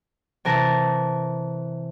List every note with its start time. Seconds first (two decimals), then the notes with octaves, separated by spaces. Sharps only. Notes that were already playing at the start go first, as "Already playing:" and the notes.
0.45 C3 E3 A#4 A5